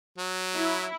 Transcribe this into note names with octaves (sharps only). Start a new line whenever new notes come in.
F#3
E4